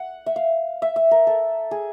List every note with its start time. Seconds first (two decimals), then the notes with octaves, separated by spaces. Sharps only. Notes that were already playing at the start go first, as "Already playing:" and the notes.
Already playing: F#5
0.26 E5
0.36 F5
0.82 E5
0.96 E5
1.11 A#4
1.27 A4
1.71 G#4